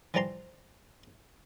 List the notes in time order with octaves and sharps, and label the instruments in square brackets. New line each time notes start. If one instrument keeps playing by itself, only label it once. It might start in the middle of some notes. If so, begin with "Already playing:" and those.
[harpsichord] E3 F3 G3 D5 A#5 C6